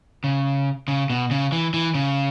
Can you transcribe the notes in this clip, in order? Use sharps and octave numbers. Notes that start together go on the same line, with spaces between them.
C#3
C#3
B2
C#3
E3
E3
C#3